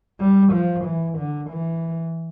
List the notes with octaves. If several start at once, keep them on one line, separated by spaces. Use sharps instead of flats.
G3
F3
E3
D3
E3